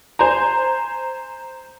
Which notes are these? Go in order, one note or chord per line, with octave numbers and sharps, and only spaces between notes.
C5 G#5 A#5